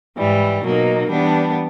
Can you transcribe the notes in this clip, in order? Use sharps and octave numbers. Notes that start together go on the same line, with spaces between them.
G#2 E3 G3
B2 F#3 A#3 D#4
E3 G3 B3 D4